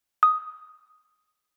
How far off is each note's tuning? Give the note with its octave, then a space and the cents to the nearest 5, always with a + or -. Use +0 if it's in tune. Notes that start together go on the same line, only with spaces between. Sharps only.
D#6 +5